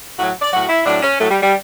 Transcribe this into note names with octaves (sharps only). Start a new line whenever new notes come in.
A2 F#3 F#4
D5
A2 F#3 F#4
E4
A2 F#3 D4
C#4
A2 F#3 A3
G3
G3